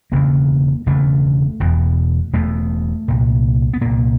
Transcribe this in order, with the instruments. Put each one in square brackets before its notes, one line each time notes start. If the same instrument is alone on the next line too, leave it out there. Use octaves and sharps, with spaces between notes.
[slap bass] E1 D2 C#3 A#3
E1 D2 C#3 A3
E1 E2 B2
E1 E2 B2 A3
C2 A#2
B3
C2 A#2 A#3